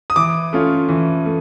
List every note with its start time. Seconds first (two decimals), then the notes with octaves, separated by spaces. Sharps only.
0.10 D#6
0.16 E3 D6
0.53 A3 C#4 F4
0.89 E3
1.26 A3